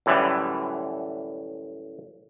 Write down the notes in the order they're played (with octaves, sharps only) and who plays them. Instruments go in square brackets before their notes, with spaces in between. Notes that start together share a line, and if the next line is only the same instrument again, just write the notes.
[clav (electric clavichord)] F#2 A2 D3 E3 G3